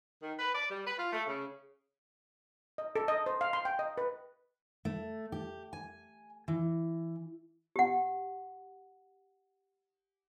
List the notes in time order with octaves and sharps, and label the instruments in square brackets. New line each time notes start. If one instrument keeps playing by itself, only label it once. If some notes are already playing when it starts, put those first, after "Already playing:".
[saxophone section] D#3
B4
D5
G3
B4
F4
A3
C#3
[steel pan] D#5
A4
D#5
C5
F5
C6
G5
D#5
B4
[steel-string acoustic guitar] A3
G4
G#5
E3
[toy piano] G4 F#5